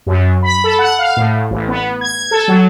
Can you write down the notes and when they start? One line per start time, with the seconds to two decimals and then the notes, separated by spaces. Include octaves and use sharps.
0.06 F#2
0.42 B5
0.64 A4
0.79 F#5
0.99 F5
1.17 A2
1.50 A1
1.68 B3
2.01 G#6
2.31 A4
2.48 F#3